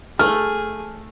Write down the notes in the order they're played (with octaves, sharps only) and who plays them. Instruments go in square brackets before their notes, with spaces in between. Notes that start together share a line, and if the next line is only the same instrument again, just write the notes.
[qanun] A3 [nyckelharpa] G#4 [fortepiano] F6